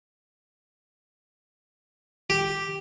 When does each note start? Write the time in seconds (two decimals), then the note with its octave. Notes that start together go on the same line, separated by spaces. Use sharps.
2.30 G4